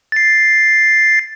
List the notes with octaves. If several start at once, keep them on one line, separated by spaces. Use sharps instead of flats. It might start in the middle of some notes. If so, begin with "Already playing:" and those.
A6 C7